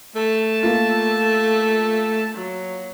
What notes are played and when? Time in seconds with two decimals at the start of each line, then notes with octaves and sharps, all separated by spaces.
0.16 A3 A5
0.63 A#3 F4
2.35 F#3